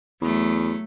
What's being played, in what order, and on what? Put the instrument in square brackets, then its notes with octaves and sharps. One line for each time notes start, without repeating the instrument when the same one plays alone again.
[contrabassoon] E2 [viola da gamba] F#3 A3